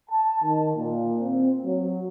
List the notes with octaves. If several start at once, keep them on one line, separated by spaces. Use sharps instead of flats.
A5
D#3
A#2
C4
F#3